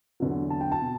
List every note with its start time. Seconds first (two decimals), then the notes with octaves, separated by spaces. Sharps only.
0.20 E2 D3 F#3
0.50 A5
0.61 G5
0.72 A5
0.81 B2